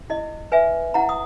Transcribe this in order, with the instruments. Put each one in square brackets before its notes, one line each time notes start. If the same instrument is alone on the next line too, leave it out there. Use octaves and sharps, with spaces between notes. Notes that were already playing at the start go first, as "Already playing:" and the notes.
[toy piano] E4 D#5
B4 E5 G#5
E4 F#5 A#5
D#6